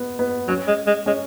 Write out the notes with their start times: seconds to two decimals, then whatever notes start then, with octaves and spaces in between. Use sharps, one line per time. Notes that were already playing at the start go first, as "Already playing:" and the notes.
Already playing: B3
0.19 B3
0.48 F#3 C#4
0.67 G#3
0.87 G#3
1.06 G#3 C#4